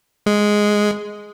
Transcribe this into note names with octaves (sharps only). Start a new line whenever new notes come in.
G#3